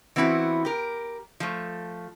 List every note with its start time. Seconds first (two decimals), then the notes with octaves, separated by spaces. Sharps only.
0.16 E3 B3 C4 E4 F#4
0.65 G4 A#4
1.40 F3 A3